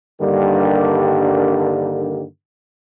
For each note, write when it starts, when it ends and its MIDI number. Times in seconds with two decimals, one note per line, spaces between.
0.20 2.23 43
0.20 2.23 50
0.20 2.23 51
0.20 2.23 55
0.20 2.23 58